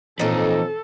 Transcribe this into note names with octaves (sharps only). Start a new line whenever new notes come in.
F2 A#2 E3 D#4 A4 B4 C#5